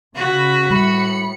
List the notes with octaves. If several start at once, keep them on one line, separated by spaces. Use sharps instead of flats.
C#3 F#4 B5 B6
A2 G3 B5 C#7